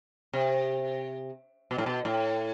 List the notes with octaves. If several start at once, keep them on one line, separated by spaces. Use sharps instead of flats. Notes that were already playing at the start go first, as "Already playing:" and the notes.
C3
B2
A2
B2
A2